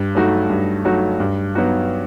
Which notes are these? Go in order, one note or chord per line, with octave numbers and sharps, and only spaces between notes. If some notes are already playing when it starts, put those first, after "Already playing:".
Already playing: G2
F#3 A3 D#4 F#4
G2
F#3 A3 D#4 F#4
G2
F#3 B3 D#4 F#4